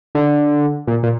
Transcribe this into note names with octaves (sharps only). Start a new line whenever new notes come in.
D3
A#2
A#2